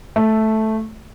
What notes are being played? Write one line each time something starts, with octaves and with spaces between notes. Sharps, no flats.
A3